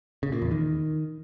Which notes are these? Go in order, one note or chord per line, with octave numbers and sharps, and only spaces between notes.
C#3
A#2
E2
D#3